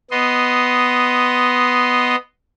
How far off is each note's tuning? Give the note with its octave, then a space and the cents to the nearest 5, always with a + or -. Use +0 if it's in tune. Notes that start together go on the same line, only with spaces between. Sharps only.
B3 +5 D#5 +0 C6 +0